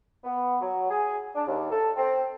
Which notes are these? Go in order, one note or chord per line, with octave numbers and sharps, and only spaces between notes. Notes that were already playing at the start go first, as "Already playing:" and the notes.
B3
F#3
G#4
D4
D#2
A4
C4